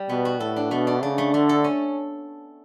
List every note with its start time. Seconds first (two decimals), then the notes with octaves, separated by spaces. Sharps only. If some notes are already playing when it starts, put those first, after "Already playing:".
Already playing: G3
0.09 B2 B3
0.25 F#4
0.40 A2 A4
0.56 D4
0.71 B2 A3
0.87 D4
1.02 C#3 D4
1.18 A3
1.33 D3 A3
1.49 A4
1.64 C#4